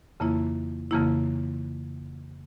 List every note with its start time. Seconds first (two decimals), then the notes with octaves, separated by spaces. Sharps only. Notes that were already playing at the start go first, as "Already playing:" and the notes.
0.20 F2 C#3 E3 A#3 E4
0.91 F2 C#3 E3 A#3 E4